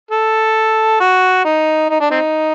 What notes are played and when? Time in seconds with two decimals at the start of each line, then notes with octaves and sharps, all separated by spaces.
0.11 A4
1.01 F#4
1.45 D#4
1.90 D#4
2.01 D4
2.11 C4 D#4